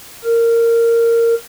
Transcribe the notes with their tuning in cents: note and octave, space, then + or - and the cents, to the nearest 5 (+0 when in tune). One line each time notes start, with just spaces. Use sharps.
A#4 -15